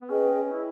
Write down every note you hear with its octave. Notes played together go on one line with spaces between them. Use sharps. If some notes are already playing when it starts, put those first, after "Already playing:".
B3
C#4 G#4 B4 D#5 G5
E4